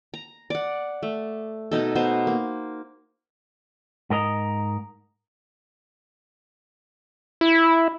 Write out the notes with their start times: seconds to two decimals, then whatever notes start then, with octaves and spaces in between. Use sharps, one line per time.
0.14 A#5
0.50 D5 F#5
1.03 A3
1.71 B2 D#4 A4
1.95 B2 B3 C5
2.27 A#3
4.10 G#2 A#4 D#5 A#5
7.41 E4